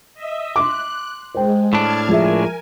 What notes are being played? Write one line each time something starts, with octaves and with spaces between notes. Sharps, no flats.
D#5 E5
C6 D6 F#6
G#3 C5 G5
A2 D4 A5 F6 G#6
F3 G#3 A#4 E5 G#5